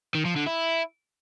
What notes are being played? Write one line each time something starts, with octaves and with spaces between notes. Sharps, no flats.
D#3
F3
D3
E4